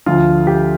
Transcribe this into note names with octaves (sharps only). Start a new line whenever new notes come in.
D2 D3 F3 F4
G4